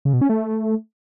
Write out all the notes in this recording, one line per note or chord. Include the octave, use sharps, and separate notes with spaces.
C#3
B2
C#4
A3